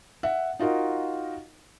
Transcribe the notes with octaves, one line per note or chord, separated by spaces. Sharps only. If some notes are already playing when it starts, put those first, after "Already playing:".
E5 F#5
D#4 F4 F#4 A#4 D#5